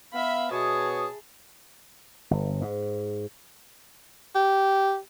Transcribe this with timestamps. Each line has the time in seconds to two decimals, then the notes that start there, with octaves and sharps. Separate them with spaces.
0.14 B3 E5 F5 B5
0.51 B2 G#4 C#5 A5 D#6
2.31 G1
2.62 G#2
4.35 G4